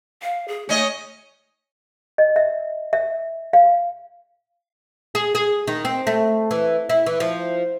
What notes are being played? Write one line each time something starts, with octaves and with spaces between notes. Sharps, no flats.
F5
G#4
A3 C#4 D#5
D#5
E5
E5
F5
G#4
G#4
D#3
C4
A3
E3
E4
E3
F3